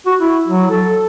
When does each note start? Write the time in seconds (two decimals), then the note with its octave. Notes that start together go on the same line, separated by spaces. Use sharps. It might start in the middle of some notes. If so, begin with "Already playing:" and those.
0.06 F#4
0.20 E4
0.47 F#3
0.71 A4